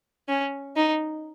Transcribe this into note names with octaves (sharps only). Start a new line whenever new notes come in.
C#4
D#4